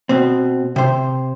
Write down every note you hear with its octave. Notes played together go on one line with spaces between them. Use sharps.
B2 C4
C3 C5